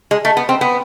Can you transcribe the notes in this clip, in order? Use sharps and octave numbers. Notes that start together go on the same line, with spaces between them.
G#3
A3
B3
C4
B3